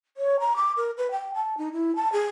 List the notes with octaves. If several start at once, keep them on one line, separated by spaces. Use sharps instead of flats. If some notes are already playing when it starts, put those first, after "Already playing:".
C#5
A#5
D6
A#4
B4
G5
A5
D#4
E4
A5
G#4